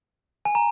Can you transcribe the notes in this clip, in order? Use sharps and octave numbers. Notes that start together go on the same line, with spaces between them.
G#5
A#5